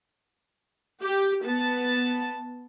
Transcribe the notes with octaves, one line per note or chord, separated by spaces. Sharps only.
G4
B3 A5